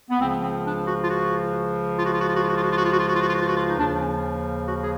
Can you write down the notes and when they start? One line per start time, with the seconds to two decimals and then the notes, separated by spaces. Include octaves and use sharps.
0.10 B3
0.19 C#2 C#3 F3 C4
0.42 C4
0.65 D4
0.86 F#4
1.03 F4
1.09 F#4
1.98 F4
2.06 F#4
2.12 F4
2.20 F#4
2.27 F4
2.34 F#4
2.41 F4
2.49 F#4
2.55 F4
2.63 F#4
2.70 F4
2.77 F#4
2.85 F4
2.92 F#4
2.99 F4
3.06 F#4
3.13 F4
3.21 F#4
3.28 F4
3.35 F#4
3.42 F4
3.48 F#4
3.57 F4
3.67 D#4
3.77 D#2 C#3 F3 D4
4.00 C#4
4.66 F#4
4.82 G#4